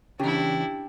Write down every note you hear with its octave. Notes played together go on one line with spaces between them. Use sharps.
E2 C#3 D4 E4 G4